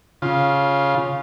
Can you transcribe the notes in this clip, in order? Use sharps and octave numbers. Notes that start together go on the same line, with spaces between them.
C#3 F4